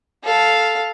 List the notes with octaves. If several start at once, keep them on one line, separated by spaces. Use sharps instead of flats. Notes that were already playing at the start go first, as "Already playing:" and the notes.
A4 F5